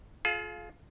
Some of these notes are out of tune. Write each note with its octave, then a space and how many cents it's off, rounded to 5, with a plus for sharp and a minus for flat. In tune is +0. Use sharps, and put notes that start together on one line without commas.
F4 +5 G#4 +45 F5 +0